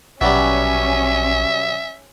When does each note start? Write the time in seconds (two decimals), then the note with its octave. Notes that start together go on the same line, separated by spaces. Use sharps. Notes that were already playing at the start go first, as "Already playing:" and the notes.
0.21 A#1 B2 F#3 G3 C#4 E5